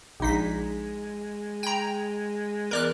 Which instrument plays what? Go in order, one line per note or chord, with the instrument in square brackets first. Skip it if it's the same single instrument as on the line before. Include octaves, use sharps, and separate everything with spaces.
[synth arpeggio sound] A#1 D#4 B6 [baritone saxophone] G#3
[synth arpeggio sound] G5 A#5
[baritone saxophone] E2 [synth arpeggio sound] A#4 D5 F#6